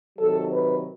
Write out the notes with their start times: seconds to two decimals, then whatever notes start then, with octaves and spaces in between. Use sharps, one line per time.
0.19 C3 D#3 F#3 A4
0.52 B4